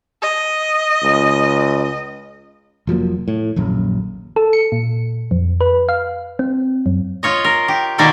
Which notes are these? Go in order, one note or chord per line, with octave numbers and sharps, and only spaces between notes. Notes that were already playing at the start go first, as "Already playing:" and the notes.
D#5
C#2
F1 F3 F#3 A#3
A2
D#1 A#1 F#2
A4
C#7
A#2
F2
B4
F5
C4
F#2
F4 C#5 D#5
A#4
G4
B2 D#3 A#3 F4 D5 E5